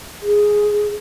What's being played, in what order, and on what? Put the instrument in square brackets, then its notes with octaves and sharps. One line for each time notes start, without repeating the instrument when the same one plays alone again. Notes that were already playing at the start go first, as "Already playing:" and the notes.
[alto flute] G#4